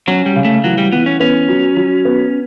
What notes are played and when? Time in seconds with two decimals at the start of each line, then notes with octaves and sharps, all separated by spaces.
0.07 F#3 C#4
0.26 G3
0.36 C#3
0.45 A3
0.64 E3 F#3
0.78 G3
0.92 E3 B3
1.06 C#4
1.20 B3 C#4
1.48 F#3
1.77 F#3
2.05 B3